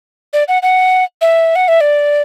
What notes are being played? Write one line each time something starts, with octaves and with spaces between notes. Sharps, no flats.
D5
F#5
F#5
E5
F#5
E5
D5